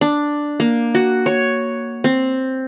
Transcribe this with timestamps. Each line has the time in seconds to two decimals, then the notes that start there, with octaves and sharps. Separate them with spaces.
0.01 D4
0.60 A#3
0.95 F#4
1.26 C#5
2.04 C4